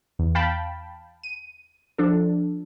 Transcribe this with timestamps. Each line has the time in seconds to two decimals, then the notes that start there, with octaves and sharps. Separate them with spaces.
0.19 E2
0.35 F5 G5 A5 B5
1.24 D#7
1.98 F3 D4 A4